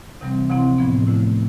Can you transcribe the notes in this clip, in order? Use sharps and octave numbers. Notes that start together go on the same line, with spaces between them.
D2 C3 E3 G3 C4
D2 C3 F3 C4 E4
A2 F3 B3
D3 A3 E4